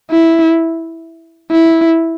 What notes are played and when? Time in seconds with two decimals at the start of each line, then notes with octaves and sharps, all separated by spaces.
0.11 E4
1.52 E4